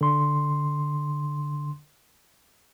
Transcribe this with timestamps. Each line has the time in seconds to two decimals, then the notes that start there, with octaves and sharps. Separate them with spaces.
0.01 D3 C6